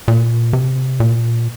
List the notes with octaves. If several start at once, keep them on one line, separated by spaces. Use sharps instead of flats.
A#2
C3
A#2